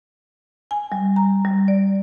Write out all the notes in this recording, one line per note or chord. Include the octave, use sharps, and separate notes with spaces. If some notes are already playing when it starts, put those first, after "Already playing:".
G#5
G3
A#5
G3
D5